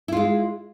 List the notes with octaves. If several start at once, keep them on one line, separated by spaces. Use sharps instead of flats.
G#3 E4 F4